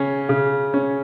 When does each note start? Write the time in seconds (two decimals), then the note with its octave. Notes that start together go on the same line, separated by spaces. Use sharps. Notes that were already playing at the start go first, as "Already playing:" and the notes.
Already playing: C#3 C#4
0.29 C#3
0.74 C#4